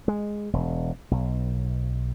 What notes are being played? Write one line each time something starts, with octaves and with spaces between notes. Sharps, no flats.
G#3
E1
B1